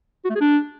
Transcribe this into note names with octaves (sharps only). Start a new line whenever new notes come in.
F#4
A3
G#4
D4